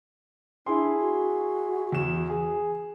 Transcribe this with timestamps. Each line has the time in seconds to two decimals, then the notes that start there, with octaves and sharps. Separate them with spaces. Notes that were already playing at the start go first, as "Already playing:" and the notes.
0.66 D4 E4 G#4 C6
1.00 F#4
1.92 E2 E7
2.30 G#4